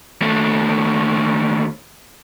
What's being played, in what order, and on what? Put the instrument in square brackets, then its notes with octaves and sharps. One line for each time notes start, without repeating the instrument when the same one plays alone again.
[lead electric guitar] D#2 A3